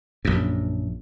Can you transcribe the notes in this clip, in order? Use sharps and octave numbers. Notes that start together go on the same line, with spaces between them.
A#1 F#2